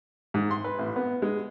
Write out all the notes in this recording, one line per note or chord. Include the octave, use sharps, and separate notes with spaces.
G#2
C6
B4
A1
B3
G#3